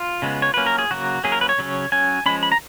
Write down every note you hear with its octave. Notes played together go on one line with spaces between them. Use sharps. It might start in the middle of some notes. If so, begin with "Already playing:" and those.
Already playing: F4
C#3 G#3 B3
C#5
F#3 A#3 C#4 B4
A#4
G#4
C#3 F#3 A#3 F#4
F#3 A#3 C#4 G#4
A#4
B4
C#5
C#3 F#3 C#4
F#3 C#4 G#5
F3 G#3 C#4 B5
B5
A#5